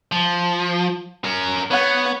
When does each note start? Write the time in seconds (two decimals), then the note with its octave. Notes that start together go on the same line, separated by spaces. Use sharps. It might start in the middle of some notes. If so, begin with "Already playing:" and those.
0.12 F3
1.24 C#4 A#4
1.71 B3 C#5 F#5